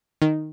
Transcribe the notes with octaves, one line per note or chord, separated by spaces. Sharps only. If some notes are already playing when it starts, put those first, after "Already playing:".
D#3